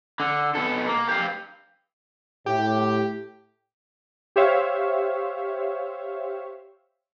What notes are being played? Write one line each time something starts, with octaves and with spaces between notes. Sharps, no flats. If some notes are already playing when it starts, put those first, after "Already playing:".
D3
B2 A4
A#3
G4 F5
A2 G4
G4 C5 C#5 E5 F5